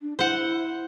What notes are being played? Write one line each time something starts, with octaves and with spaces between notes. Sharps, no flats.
D4
E4 C5 F#5